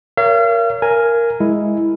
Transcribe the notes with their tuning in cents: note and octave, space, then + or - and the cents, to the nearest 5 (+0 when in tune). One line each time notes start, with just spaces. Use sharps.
A#4 +0 C#5 +25 F5 -40
A#4 +0 G#5 +0
G#3 +0 E4 +0